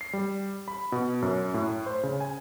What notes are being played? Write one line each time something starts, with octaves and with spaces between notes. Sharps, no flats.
C7
G3
B5
B2
F#2
A2
C5
C#3
G#5